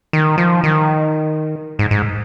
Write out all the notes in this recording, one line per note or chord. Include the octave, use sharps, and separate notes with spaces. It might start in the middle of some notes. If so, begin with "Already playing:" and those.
D#3
F3
D#3
G#2
G#2